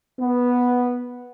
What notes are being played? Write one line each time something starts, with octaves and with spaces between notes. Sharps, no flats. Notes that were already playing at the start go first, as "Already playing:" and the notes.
B3